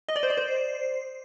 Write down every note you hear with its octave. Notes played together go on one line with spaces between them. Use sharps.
D#5
D5
C5
D5
C5